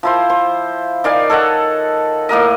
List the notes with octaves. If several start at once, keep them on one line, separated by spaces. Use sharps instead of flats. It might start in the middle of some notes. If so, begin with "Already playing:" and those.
F3 E4 C5
C5
D#3 D5 F5 G#5
A4 C#5 D#5 F#5
A2 A#3 A#4 D#5